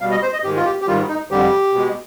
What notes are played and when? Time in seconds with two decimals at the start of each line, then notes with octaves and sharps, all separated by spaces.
0.01 B2 G3 F5
0.11 D#5
0.22 C5
0.33 D#5
0.44 G#2 D#3 G#3 G4
0.56 F4
0.65 G4
0.82 G4
0.87 G#2 D#3 G3 F4
1.08 D#4
1.31 F2 D3 G3 G4
1.73 B2 G#3